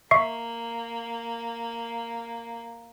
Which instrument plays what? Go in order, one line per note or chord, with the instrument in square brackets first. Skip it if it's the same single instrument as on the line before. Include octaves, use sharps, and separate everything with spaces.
[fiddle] A#3 [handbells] E5 C#6 C7